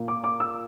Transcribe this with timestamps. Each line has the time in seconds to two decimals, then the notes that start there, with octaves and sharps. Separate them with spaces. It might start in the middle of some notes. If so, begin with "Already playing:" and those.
Already playing: A#2 A#3
0.08 D6
0.24 D6
0.40 E6